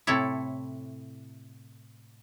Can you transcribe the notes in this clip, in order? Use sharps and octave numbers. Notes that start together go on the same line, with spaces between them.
A2 C3 E4 A4 C#5 E5